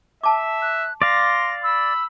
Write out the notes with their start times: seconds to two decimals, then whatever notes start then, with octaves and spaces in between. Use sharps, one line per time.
0.23 E5 A5 D6
0.62 F#6
1.02 D5 F5 C6 A#6
1.64 B5 E6